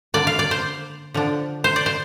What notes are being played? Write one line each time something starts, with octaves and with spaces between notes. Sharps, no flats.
D3 A#3 D4 D5
F5
D5
C5
D3 F3 D4
C5
D5
C5